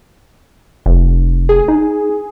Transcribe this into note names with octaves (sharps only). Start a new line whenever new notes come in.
F1
G#4
D#4